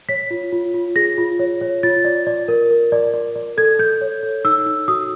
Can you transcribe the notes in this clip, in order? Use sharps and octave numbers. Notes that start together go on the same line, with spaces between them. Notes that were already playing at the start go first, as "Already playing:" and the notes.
C#5 B6
F4
F4
F4
G#4 A#6
F4
C#5
C#5
F4 A6
D5
D5
A#4
A#4
D5
D5
D5
A4 G#6
A4 G6
C#5
A4
D#4 E6
D#4
F#4 D#6